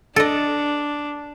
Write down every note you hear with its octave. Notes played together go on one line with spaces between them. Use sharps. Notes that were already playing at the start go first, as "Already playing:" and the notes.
D4 A4 D#5